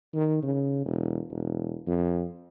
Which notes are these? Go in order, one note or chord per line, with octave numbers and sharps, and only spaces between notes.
D#3
C#3
E1
E1
F2